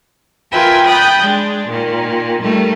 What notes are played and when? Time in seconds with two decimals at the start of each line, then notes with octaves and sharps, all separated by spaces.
0.52 F4 A#4 B4 E5 G5 G#5
0.86 G5 B5 D#6 F#6 G6 A6
1.23 G#3 D4
1.70 A#2 D#3
2.41 D#3 G3 A3